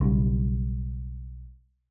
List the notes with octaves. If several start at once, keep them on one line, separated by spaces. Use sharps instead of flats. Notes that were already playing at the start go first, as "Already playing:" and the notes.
B1 C#3 G3